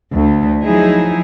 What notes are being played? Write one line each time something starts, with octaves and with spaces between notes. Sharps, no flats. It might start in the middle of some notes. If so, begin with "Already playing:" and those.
D2 A3
F3 F#3 D#4 E4 G#4